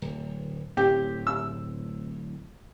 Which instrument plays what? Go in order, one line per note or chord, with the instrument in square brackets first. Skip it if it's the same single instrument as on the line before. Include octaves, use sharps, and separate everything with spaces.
[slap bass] D1
[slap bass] D1 A2 C4 [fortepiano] G4
[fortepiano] E6